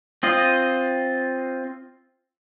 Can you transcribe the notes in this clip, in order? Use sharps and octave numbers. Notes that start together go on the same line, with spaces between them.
C4 F4 D#5